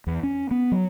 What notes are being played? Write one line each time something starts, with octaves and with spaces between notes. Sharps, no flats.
E2
C#4
B3
F#3